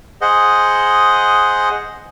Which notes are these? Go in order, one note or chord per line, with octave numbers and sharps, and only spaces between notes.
G#4 C5 D#5 F#5